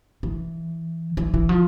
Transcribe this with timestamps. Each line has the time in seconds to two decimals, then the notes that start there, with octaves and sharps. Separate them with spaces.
0.23 E3
1.17 E3
1.34 E3
1.49 F3